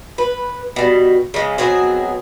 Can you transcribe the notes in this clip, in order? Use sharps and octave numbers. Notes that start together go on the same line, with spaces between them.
B4
B2 G3
C#3 G#3
B2 F#3 C4 G#4